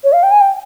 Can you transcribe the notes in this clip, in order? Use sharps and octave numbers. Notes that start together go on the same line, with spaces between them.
C#5
F5
G5
G#5
G5